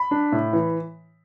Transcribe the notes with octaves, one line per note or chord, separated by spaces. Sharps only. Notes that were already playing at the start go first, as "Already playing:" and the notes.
Already playing: B5
D4
A2
E3